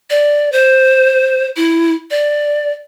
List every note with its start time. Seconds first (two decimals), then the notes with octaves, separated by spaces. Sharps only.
0.10 D5
0.52 C5
1.56 E4
2.11 D5